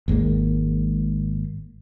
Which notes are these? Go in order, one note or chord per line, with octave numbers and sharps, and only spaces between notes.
G#1 G#2 G#3 A#3